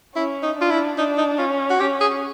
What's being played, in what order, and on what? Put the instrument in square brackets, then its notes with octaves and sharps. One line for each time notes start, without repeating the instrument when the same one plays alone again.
[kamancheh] C#4 [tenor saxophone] E4
[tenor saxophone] D#4
[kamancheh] D4 [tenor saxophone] F4
[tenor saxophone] E4
[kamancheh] D4 [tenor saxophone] D#4
[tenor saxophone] D#4
[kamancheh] C#4 [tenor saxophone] F4
[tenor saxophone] F#4
[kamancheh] C#4 [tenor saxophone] G4
[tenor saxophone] G#4